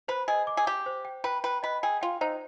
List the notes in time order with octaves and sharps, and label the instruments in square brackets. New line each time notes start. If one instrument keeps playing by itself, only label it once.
[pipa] B4 [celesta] C5
[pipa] G#4 [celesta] D#5
[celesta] D6
[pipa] G#4
[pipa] G4 [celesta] D6
[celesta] C5
G5
[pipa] B4 [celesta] G5
[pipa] B4 [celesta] G5
[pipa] B4 [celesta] D#5
[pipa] G#4 [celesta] G5
[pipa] F4 [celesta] G5
[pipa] D#4 [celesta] C5